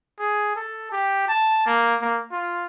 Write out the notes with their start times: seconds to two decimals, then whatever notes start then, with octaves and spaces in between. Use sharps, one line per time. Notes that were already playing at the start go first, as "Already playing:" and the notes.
0.19 G#4
0.56 A4
0.92 G4
1.28 A5
1.66 A#3
2.01 A#3
2.31 F4